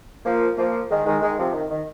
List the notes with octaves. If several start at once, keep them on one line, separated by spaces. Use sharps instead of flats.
F3 A#3
F3 A#3
D#3 G#3
D#3 G#3
D#3 G#3
C3 F3
D#3
D#3